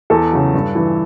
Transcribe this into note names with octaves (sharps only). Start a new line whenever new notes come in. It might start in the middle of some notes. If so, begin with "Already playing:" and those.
E2 A4
C#3 F#3
G2
E3